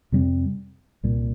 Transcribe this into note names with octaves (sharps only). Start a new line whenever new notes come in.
F2 C3 G3 C4
C2 A#2 G3